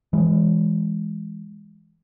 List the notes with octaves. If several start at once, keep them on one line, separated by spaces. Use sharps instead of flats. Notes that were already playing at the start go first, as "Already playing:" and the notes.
E3 G#3